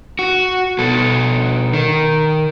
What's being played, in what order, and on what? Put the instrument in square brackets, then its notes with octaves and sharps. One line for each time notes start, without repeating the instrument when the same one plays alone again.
[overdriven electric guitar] F#4
B2 A4
D#3